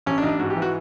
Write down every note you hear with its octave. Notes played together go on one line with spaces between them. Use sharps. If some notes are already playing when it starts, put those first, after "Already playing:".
A1 C#4
D4
A1 D#4
D4
G#2 F#4
G4
E3
F#4